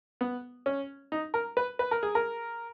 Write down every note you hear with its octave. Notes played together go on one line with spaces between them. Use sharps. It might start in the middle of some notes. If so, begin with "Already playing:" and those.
B3
C#4
D#4
A#4
B4
B4
A#4
G#4
A#4